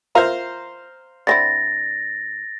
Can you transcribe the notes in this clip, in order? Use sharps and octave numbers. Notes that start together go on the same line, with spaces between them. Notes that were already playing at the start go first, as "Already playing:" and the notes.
F4 A#4 C5 E5 F5 A#5
D3 C4 E4 A6 A#6